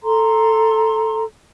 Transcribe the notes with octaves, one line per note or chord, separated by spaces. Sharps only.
A4 A#5 C6